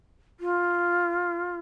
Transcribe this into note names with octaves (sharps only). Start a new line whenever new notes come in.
F4